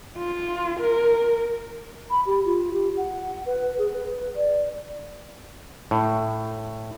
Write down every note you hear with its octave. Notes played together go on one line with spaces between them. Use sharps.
F4
A#4
B5
G4
F4
G4
F#5
B4
G#4
B4
D5
A2